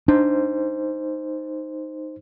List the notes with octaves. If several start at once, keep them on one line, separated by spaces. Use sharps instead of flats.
D4 D#4 C5